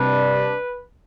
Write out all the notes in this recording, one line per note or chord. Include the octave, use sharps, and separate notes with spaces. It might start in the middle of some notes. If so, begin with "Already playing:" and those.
Already playing: C3 G3 D4 B4